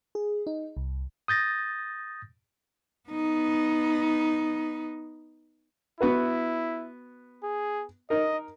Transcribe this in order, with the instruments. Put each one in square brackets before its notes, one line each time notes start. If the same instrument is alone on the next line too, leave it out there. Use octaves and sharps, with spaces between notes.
[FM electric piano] G#4
D#4
C2
[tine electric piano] D#6 G6 A6 A#6
[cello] B3 D#4
[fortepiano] B3 F#4 B4 [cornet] E4
[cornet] G#4
[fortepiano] D#4 A#4 [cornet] D#5